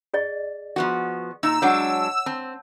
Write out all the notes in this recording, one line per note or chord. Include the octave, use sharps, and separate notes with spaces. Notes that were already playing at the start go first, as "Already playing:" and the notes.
G#4 D5 D#5
F3 B3 F#4
A#2 D#4 E6
F#3 G#3 D4 C#5 F#5
C4 A5 E6